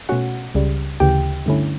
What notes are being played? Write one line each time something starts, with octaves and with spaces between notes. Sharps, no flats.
B2 A3 C#4 F#4 F#5
C#2 C#3 G3
D2 C#3 E3 G4 G5
G2 D3 A3 C#4 E4